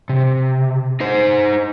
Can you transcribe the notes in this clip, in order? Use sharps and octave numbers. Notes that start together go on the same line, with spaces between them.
C3
D#4 C5